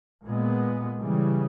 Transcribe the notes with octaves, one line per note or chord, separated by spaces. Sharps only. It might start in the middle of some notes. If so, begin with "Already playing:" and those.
A#2 G#3 B3
C#3 E3 G3